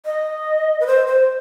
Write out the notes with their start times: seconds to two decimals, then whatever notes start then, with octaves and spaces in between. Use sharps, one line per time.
0.05 D#5
0.80 B4
0.87 C5
1.07 C5